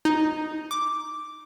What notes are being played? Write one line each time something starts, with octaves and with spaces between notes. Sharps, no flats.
D#4
D6